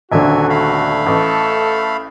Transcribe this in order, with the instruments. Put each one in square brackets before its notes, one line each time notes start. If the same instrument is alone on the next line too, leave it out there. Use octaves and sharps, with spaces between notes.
[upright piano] D#1 D3 [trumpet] F#4 [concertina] E5 G#5
[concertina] A3 F5 B5
[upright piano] A1 [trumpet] A4